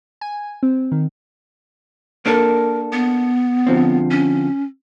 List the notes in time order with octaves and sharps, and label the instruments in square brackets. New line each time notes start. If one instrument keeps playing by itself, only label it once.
[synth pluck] G#5
C4
D#3
[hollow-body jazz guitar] A#3 D4 A4 [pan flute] A#4
[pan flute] B3
[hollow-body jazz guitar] D3 F3 C4
[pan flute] C#4